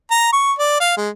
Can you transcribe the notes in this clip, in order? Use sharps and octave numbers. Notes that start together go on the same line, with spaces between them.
A#5
C#6
D5
F5
G#3